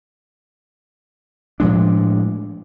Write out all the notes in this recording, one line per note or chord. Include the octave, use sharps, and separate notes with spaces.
A2 F3 G#3 D4